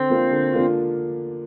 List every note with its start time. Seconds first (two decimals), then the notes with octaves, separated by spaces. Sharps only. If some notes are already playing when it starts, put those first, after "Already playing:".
Already playing: D3 C4
0.10 F3 A#3 D4 F4
0.31 D3
0.53 F3 A#3 D4 F4